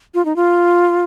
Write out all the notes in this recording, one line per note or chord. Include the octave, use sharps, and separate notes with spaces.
F4
D#4
F4